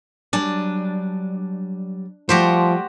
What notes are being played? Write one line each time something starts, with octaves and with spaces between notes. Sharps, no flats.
F#3 G3 D4 G#5
F3 G3 A3 F#4 G4 C5